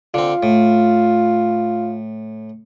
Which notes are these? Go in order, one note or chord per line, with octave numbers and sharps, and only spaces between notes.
D3 C4 F4
A2